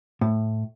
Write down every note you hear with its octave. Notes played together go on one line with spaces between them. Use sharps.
A2